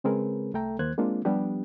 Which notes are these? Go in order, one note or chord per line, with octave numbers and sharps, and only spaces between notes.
C#3 G#3 C4 G#4 A#4 B4
C2 A3 A4 E5 G5 A#5
D#2 D#3 A#3 C5 F#6 G#6
G#3 A#3 C4 D4 F4
F3 G3 B3 D4 G4